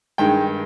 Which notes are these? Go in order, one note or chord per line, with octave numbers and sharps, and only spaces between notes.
G2 D#3 G#3 G5